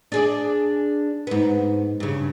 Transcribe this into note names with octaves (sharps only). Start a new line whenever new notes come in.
D4 G#4 D5
G#2 B3
G2 C#3